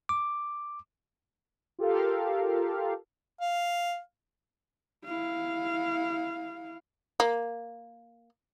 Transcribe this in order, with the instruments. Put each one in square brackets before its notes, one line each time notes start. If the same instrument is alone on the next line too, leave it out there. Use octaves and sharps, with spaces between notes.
[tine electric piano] D6
[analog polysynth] F4 G4 A4 A#4 F5
[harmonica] F5
[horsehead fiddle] E4 F5
[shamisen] A#3